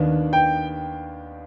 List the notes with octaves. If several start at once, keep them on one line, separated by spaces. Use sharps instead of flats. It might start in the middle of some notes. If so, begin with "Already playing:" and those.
Already playing: D#2 D#3 B3 D4
G5